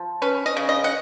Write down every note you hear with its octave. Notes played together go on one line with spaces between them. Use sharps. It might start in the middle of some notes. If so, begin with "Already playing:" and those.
Already playing: F3
C#4 B4
D#5
C#3
D#5
F#5